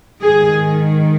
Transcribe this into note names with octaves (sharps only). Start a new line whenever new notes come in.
G#2 D#3 G#4